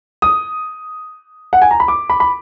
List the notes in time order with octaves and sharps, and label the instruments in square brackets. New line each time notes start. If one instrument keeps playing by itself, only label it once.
[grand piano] D#6
F#5
G#5
A#5
B5
D6
B5
B5